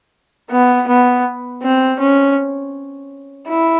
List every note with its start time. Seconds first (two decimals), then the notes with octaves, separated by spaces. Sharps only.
0.50 B3
0.88 B3
1.63 C4
2.00 C#4
3.48 E4